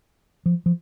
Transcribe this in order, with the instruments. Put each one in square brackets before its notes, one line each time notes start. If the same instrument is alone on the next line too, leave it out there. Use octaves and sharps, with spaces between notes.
[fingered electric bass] F3
F3